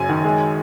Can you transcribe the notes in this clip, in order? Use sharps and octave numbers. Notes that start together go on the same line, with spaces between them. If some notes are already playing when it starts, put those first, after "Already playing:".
Already playing: F#1 F#2 G#5
D#3
G#3